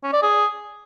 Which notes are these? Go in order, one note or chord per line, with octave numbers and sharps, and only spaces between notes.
C#4
D5
G#4